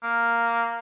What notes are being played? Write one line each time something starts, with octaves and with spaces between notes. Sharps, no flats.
A#3